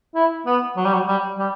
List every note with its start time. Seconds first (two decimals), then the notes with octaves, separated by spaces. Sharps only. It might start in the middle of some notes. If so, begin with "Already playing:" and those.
0.15 E4
0.46 B3
0.77 F#3
0.85 G3
0.93 F#3
1.08 G3
1.39 G3